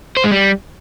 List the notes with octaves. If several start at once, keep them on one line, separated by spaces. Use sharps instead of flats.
C5
G#3
G3